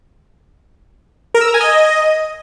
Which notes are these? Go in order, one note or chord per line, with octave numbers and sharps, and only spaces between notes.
A#4
E6
A#5
G#5
D#5